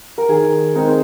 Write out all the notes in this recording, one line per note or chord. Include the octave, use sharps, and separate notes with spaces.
A#4
D#3 G#4
G#3 C4 D#4 A#4
C5